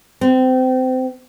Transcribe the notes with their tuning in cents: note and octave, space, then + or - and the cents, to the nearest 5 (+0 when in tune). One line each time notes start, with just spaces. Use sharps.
C4 -25